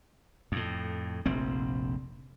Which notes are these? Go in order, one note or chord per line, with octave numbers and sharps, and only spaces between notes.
F2 A2
F1 A#1 C4